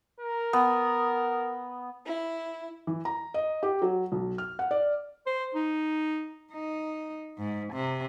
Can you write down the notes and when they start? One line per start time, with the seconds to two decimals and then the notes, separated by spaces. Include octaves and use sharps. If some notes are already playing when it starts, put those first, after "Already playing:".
0.20 A#4
0.53 B3
2.06 E4
2.87 E3
3.05 A#5
3.34 D#5
3.63 G4
3.82 F#3
4.12 B1
4.38 F6
4.59 F#5
4.71 D5
5.26 C5
5.55 D#4
6.52 D#4
7.38 G#2
7.74 C3